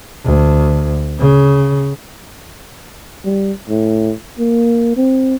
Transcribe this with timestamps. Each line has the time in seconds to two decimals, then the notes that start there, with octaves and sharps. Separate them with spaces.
0.25 D2
1.19 C#3
3.25 G3
3.69 A2
4.39 A#3
4.97 C4